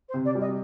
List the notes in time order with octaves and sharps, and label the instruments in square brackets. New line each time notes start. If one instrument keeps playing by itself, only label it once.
[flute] C5
[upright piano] C3
[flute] D5
[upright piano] G3
[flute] D#5